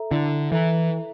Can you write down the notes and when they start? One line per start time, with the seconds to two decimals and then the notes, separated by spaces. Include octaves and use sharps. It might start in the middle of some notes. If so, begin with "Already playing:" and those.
Already playing: A4 E5 A#5
0.11 D3 E4
0.52 E3 A4 E5 A#5